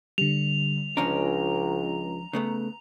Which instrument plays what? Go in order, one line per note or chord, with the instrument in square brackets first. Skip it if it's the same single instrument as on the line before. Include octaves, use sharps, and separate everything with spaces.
[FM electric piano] D3 G3 [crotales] F7
[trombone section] C#2 [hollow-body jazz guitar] F3 C#4 D4 [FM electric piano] A#5
[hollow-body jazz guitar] C#3 A3 B3